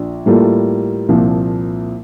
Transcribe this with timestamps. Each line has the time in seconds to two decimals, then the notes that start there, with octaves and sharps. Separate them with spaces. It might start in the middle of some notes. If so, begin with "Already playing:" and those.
Already playing: A#1 D4
0.26 A2 G3 A#3 F4 A4
1.09 C2 A#2 F3